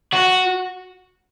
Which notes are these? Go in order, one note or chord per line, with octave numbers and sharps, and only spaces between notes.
F#4